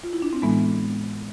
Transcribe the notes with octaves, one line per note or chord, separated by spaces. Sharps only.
F4
E4
D4
C4
A2 E3 G#3 B3